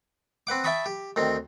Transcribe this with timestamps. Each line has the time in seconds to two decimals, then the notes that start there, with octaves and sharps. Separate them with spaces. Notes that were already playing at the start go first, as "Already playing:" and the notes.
0.47 C4 B4 F#5 D6
0.64 E5 G5 A5 B5 C#6 D#6
0.86 G4
1.16 D2 D#3 C4